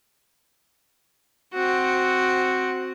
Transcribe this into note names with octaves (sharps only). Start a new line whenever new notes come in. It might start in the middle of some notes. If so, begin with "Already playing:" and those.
C4 F#4